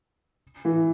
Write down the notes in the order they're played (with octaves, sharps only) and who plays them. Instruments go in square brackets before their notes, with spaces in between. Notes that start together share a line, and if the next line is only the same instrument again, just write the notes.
[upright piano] E3